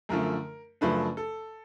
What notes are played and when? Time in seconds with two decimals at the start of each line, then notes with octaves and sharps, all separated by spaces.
0.09 F#2 D3 F3 A3 A#4
0.81 F#2 C#3 F3 A3 D4 B4
1.17 A4